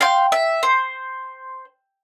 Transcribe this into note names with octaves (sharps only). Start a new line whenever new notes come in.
F5 G5 C6
E5
C5